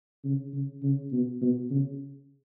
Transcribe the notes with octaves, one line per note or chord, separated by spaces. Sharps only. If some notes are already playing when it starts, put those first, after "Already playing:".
C#3
C#3
C#3
B2
B2
C#3